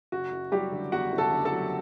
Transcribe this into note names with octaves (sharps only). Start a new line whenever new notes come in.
F#1 F#4
F#1
F#3 G3 G4
D3
E2 F#4 F#5
F#1
A4 A5
D3
A4 A5
F#3